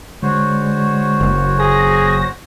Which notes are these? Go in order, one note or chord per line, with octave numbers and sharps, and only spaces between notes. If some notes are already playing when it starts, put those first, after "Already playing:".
D3 G#3 F#4 C5 C#5
F#1
G#4 A#6